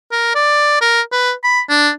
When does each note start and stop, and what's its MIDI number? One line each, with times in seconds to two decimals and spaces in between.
0.12 0.30 70
0.35 0.76 74
0.81 1.01 70
1.12 1.33 71
1.44 1.61 83
1.69 1.90 62